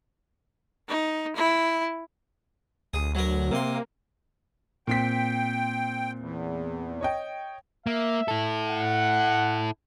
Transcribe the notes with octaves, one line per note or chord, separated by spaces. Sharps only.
D#4
E4
D2 G#4
F#3 A#4
C3 A#3 C6
A#2 C4 G5 B6
E2
C#5 D#5 G5
A#3 E5
E4 A4
F#5